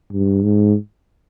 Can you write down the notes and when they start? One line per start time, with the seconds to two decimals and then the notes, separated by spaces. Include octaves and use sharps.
0.13 G2
0.43 G#2